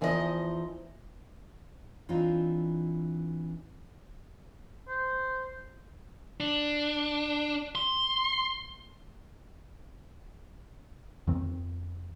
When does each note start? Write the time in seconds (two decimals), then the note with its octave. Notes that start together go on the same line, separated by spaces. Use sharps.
0.01 E2 E3 F3 D#4 G4 D#5
2.09 E3 C4 D4 D#4 F4
4.88 C5
6.40 D4
7.75 C6
11.27 F2 D#3 C4